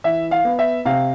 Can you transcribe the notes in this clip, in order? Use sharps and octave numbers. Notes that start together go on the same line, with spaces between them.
E3 E5
F5
B3
E5
C3 F5